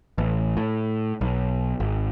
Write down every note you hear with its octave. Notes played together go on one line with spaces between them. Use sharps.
A1
A2
B1
G#1